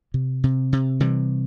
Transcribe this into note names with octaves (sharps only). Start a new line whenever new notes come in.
C3
C3
C3
C3 E3 G3